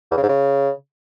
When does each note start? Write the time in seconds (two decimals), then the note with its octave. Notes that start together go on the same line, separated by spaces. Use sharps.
0.11 E2
0.17 C#3
0.23 G#2
0.29 C#3